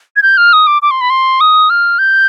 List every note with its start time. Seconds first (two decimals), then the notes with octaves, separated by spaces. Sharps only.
0.16 G#6
0.23 G6
0.37 F6
0.53 D#6
0.67 D6
0.82 D6
0.91 C6
1.01 B5
1.10 C6
1.41 D#6
1.70 F6
1.99 G6